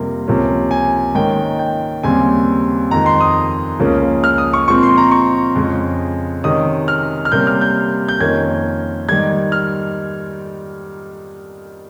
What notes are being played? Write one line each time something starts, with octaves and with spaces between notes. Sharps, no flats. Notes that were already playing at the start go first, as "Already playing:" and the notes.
Already playing: F2 C3 G3 A#3
C#2 C3 F3 A#3 C#4
G#5
G#2 D#3 A#3 C#4 G5
G5
D#2 C#3 G3 C4 G#5
F2 D#3 G#3 A#5
C6
D#6
C#2 C#3 F3 A#3 C#4
F6
D#6
C#6
A#2 F3 G#3 C4 C#6
C6
A#5
C#6
F2 C#3 G#3
C3 D#3 G#3 C#4 D#6
F6
F6
C3 G3 A#3 C#4 G6
F6
G6
G6
F2 D#3 A#3 C#4 G#6
G#2 D#3 G3 G#6
F6